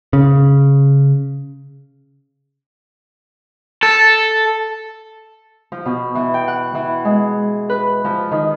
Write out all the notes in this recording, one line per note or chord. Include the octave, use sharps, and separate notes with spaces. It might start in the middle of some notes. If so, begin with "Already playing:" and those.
C#3
A4
F3
B2
E3
G5
F#5
E3
G#3
B4
F3
D#3